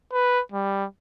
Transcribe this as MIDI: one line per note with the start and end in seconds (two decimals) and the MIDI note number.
0.12 0.41 71
0.52 0.85 55